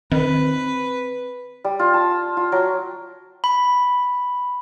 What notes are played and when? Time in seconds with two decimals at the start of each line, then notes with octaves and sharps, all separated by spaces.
0.12 D#3 C4 B4
1.64 G3
1.79 F4
1.94 A5
2.37 F4
2.52 F#3
3.44 B5